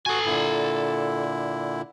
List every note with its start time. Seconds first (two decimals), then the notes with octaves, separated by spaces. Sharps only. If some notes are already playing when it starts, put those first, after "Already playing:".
0.06 F#4 A4 G#5
0.26 A#2 D3 E4